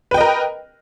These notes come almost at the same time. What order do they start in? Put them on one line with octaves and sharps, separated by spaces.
B4 G5 D#5 A#4